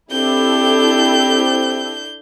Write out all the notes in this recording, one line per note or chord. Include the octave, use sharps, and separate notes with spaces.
C4 D4 E4 G4 A4 G6